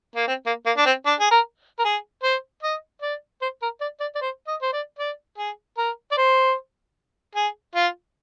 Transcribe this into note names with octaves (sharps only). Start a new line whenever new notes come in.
A#3
C4
A#3
A#3
D4
C4
D4
G#4
A#4
A#4
G#4
C5
D#5
D5
C5
A#4
D5
D5
D5
C5
D#5
C5
D5
D5
G#4
A#4
D5
C5
G#4
F4